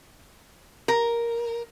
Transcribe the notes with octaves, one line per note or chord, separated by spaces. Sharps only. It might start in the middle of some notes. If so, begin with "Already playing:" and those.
A#4